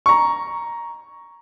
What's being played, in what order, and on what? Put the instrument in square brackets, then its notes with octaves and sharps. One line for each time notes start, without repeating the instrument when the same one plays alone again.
[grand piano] A#5 C#6